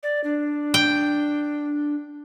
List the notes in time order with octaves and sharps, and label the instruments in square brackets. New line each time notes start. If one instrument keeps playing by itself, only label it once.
[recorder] D5
D4
[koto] G5